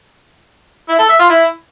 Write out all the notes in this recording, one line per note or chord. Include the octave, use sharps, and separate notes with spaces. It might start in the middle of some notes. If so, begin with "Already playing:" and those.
E4
A4
E5
F4
E4